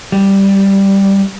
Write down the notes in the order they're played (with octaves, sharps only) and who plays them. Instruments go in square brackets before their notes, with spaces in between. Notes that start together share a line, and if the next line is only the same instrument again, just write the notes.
[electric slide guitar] G3